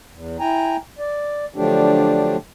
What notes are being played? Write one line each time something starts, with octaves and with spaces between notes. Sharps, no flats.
E2
E4 G5 G#5 A#5
D5
D3 F3 F#3 A3 D4 G4